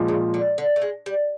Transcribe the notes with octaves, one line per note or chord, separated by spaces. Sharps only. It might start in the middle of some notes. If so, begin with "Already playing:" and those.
Already playing: A#2 F3 G#3
C#3
D3
D3
A3
G#3
G3